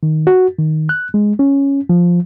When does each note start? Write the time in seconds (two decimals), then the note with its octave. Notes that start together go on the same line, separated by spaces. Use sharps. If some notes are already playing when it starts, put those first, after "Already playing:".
0.03 D#3
0.27 F#4
0.58 D#3
0.89 F#6
1.14 G#3
1.39 C#4
1.89 F3